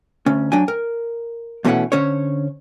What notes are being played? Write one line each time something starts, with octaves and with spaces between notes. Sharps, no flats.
D2 C#4
F#3 D4 G5 G#5
A#4
E2 B2 A3 C#4 E4 F#5
D3 C#4 C5 C#5